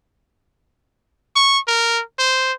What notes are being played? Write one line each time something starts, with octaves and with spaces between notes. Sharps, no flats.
C#6
A#4
C5